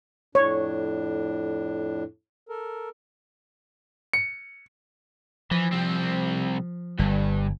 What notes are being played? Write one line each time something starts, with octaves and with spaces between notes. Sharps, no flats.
F2 A2 D4 C#5
A4 A#4
C#7
E3 F3
C2 C4
G1 G2